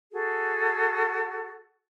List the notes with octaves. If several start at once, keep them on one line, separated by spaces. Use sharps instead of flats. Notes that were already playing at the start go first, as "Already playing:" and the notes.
F#4 G#4 A4